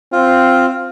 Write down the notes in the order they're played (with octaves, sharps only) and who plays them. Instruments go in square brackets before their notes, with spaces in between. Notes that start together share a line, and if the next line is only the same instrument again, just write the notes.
[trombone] C4 [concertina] F4